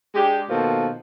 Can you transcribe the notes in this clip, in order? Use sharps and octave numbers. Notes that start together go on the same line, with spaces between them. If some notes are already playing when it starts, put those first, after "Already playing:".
G#3 D4 G4
B2 D#3 F3 A#3 A4